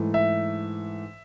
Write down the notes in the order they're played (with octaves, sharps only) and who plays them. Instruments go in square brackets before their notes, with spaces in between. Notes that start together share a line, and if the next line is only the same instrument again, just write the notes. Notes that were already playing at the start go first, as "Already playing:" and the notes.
Already playing: [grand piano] G#2 E3 A3
E5